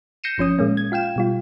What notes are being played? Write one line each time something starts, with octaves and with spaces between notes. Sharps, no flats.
G6 A#6 C7 C#7 D#7 E7
G1 F3 C#4 D#6
A#2 G#3 A#3 C#4
G#6
F4 F5 G5 E7
B2 G3 F4